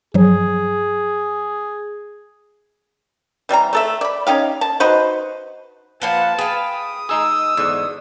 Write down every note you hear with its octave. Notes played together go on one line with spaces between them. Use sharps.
G2 F3 F#3 G#4
E3 G3 C4 A#5
A3 A4 E5
D5 B5
C#4 D#4 G4 F5
A5
D#4 F#4 B4 C5
F3 A#3 B4 F#5 A5
G#4 B4 F5 G5
D#6
G#3 D#4 G#4 E6
E2 G#2 D3